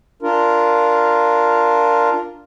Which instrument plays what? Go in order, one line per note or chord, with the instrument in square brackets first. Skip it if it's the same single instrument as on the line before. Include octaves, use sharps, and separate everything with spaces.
[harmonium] D4 F4 A#4